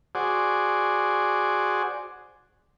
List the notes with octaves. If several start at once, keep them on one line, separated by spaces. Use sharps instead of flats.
F#4 G#4 C5 D5